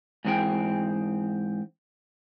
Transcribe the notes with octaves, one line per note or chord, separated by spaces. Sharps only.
G#2 E3 C4 G#4 G5